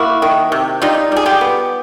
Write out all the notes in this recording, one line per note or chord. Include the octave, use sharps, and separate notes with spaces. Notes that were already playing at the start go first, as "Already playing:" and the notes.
Already playing: A#3 E4 F#4
D#3
C3
G3 D#4 F4
G3 G#4
F4 G4
B3